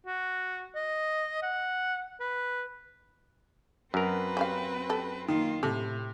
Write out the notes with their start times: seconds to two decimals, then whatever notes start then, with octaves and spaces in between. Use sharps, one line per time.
0.06 F#4
0.76 D#5
1.43 F#5
2.20 B4
3.94 F#2 C4 A#4 B4
4.37 C#4 G4 F5
4.89 G4 A4
5.28 D#3 A#3 F4
5.63 A2 C3 A4